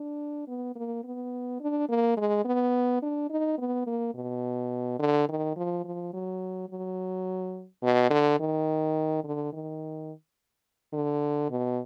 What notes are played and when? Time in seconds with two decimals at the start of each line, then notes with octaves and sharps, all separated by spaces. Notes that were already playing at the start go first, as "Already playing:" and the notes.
Already playing: D4
0.48 B3
0.75 A#3
1.04 B3
1.61 D4
1.89 A#3
2.17 G#3
2.45 B3
3.02 D4
3.30 D#4
3.58 B3
3.87 A#3
4.15 B2
4.99 D3
5.29 D#3
5.56 F3
5.84 F3
6.13 F#3
6.69 F#3
7.83 B2
8.10 D3
8.40 D#3
9.24 D3
9.53 D#3
10.93 D3
11.50 B2